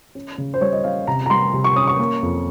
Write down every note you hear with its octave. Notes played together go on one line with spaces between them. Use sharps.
C#4
C#3
C5
G3 C#5
D#5
C#4 F5
C3 A#5
A#5
G3 C6
C3
C#6
C#4 D#6
C#6
A#3
F2